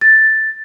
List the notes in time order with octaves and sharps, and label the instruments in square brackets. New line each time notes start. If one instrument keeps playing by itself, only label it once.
[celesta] A6